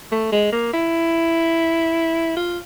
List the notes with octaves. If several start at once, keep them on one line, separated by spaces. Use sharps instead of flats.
A3
G#3
A#3
E4
F4